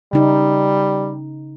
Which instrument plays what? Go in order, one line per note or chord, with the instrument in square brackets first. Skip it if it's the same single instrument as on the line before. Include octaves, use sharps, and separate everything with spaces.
[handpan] C#3 D#4 [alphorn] G3